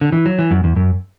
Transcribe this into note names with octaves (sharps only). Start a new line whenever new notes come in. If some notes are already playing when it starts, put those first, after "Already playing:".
D3
E3
F#3
E3
F#2
E2
F#2